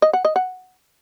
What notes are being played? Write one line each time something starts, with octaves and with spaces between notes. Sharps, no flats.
D#5
F#5
D#5
F#5